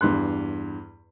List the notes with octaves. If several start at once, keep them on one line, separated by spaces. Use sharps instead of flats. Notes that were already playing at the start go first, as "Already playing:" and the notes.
E2 G2 C6 F#6